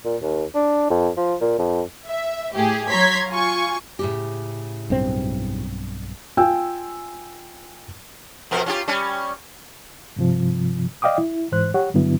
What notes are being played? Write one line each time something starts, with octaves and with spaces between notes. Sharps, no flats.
A#2
D#2
D4
F2
F3
A#2
F2
E5
A2 G4 G#4
F#3 C#5 A#5 C6 G#6 B6
F4 G#5 C#6
A2 C#3 G4
B1 G2 C4
F4 G5 G#5 E6
F2 B2 A#4
C#4 F4 G4
G3 C#4
G2 C3 F3
D5 D#5 F5 G5 D6 D#6
E4
G#2 E3 C5 F#6
G4 C#5 F#5
G2 D3 F#3 B3 E4